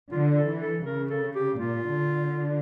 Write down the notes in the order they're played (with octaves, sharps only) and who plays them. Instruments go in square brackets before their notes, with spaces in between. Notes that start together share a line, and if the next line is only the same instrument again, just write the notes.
[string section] D3 [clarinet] F4
[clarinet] A4
[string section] E3
[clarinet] A4
[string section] C#3 [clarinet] A#4
[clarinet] A4
G4
[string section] A#2 [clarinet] F4
[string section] D3